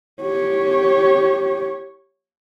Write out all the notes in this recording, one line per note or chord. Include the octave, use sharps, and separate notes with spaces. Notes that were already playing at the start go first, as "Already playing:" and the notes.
G4 C#5